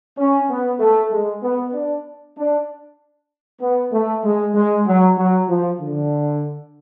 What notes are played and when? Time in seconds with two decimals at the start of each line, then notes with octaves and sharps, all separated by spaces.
0.18 C#4
0.50 B3
0.80 A3
1.11 G#3
1.43 B3
1.74 D4
2.37 D4
3.61 B3
3.92 A3
4.23 G#3
4.55 G#3
4.86 F#3
5.17 F#3
5.49 F3
5.80 D3